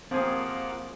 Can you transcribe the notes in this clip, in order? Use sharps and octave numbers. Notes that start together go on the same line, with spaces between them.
F3 A#3 C4 F4 G#4 F#5 D6